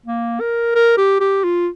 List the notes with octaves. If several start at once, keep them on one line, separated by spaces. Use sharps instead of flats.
A#3
A#4
A#4
G4
G4
F4